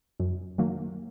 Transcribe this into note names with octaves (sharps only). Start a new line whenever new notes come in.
F#2
D#3 F#3 A#3